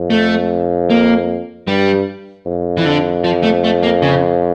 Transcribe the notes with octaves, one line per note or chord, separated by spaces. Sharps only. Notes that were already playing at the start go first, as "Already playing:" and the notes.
Already playing: F2
A3
A#3
G2 G3
F2
E3
D3
F3
A3
A3
A#3
C#3